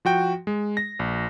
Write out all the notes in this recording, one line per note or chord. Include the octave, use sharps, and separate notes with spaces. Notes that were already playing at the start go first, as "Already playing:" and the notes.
F3 F#4 G5
G#3
A#6
A#1